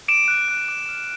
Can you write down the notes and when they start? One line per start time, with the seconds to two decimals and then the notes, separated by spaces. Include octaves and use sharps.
0.08 D6 D7 E7
0.28 F#6
0.49 F#6
0.68 D6
0.89 F6